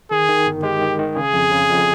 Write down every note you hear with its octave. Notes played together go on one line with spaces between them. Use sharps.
D#3 G#4
D#3
G1
G#3 G4
D#3
D#3
C#3 G#4
F2
C#3
F2